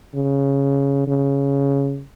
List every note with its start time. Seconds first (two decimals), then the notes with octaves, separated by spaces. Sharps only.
0.14 C#3
1.07 C#3